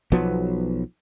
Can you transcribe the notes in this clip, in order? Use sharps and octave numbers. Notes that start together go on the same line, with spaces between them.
B1 F3 F#3 B3